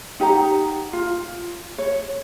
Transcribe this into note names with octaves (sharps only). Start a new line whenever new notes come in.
D#4 G4 F#5 A#5
F4
C#5